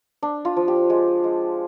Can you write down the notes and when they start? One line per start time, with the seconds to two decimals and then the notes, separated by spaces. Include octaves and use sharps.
0.22 D4
0.45 F4
0.56 F3
0.68 G4
0.90 G#3
1.24 G#3